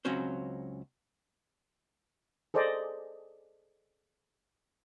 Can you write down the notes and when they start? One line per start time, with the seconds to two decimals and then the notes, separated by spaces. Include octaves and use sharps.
0.05 C#2 F#3 C4 C#4 F#4 C5
2.54 G#4 A4 C5 D5 D#5